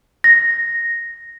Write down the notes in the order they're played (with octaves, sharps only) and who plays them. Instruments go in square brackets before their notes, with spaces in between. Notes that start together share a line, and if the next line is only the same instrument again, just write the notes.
[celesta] A#6